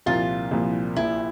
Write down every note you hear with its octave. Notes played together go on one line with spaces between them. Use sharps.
C2 A#2 F3 A#3 E4 F4
C2 A#2 F3 A#3 E4
A#1 A#2 F3 E4